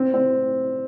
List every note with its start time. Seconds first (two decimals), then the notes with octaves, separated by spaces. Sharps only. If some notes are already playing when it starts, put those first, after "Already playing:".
Already playing: C4
0.14 C4